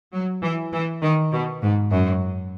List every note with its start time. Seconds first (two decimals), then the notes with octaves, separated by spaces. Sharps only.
0.13 F#3
0.43 E3
0.73 E3
1.02 D#3
1.32 B2
1.62 G#2
1.91 F#2